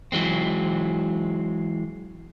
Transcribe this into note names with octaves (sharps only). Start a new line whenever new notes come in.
E3 F#3 G#3 C4